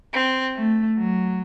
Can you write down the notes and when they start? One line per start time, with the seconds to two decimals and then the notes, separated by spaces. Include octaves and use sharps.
0.14 C4
0.56 A3
0.97 F#3